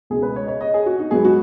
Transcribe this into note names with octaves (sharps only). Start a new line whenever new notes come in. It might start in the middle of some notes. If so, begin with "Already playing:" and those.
C#2 B2 G#3 G#4
B4
C#5
D#5
C#5
D#5
G#4
F#4
D#4
G#2 F#3 B3 G#4
F#4